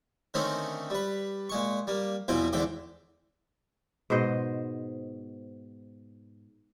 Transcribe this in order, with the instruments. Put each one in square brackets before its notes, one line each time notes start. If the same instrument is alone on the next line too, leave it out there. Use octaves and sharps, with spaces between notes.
[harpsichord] D3 D#3 A3 C4 C#4 D#4
G3 B4
A#2 G#3 C#6
G3 A#3
E2 B2 F3 C4 G5 G#5
E2 G#2 D3 A3 G5 D6
[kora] G#2 B2 C5 D#5